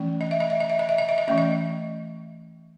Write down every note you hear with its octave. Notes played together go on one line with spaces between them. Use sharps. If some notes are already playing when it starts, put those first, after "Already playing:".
Already playing: E3 A3 C#4
D#5
E5
D#5
E5
D#5
E5
D#5
E5
D#5
E5
D#5
E3 A3 C#4 E5
D#5